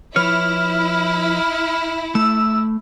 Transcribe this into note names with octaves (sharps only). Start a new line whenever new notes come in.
F3 E4 B4 C#5 F6
A3 E6